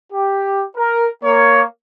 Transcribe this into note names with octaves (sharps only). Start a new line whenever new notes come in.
G4
A#4
A#3 C#5